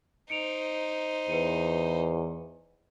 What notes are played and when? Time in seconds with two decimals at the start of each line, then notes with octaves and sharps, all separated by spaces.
0.30 D#4 C5 C#7 D7 F7
1.29 E2 B4 C#7 D#7